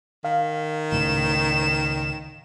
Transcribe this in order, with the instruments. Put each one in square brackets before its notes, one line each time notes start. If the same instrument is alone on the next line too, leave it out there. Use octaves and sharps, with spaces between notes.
[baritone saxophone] D#3 [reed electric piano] F5
[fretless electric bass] C#2 A2 C#3 [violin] E7